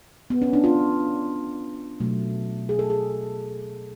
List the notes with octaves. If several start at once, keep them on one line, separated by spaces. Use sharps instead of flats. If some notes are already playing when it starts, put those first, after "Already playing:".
B3
C#4
D4
F4
B2 F#3 A3
G#4
A4
G#4